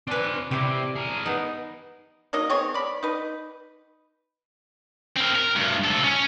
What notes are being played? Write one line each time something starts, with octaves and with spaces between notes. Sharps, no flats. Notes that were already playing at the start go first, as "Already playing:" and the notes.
C4 D4 B4 G#5
C3 G3 E4 G4
G#4 A#4
B3 D#4
F#3 A#3 D#4 D#5
B3 C4 G#4 C#5
D5 B5
D#4 B4
C4 A#4
A#4
D2 G2
C3 A4
C#4